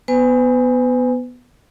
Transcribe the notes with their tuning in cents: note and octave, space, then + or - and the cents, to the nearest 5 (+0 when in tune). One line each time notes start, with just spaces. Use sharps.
B3 +0 B4 +40 G#5 -10